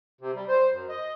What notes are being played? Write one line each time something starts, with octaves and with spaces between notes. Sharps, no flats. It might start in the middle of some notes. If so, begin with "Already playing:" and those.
C3
G3
C5
F#2
D#5